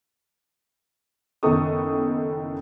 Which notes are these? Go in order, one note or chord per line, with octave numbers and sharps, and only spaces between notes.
F#1 D#3 B3 A4 C#6 D#6